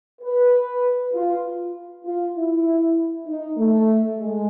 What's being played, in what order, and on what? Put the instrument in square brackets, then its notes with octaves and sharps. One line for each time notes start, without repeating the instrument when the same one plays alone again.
[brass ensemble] B4
F4
F4
E4
D#4
A3
G#3